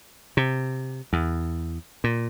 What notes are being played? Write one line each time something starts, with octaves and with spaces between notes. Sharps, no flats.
C3
E2
A#2